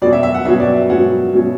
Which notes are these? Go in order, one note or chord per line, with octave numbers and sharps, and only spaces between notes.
B2 F#3 C#4 D5
E5
E5
F#5
B2 F#3 C#4 E5
D5
E5
B2 F#3 C#4 F#5
B2 F#3 C#4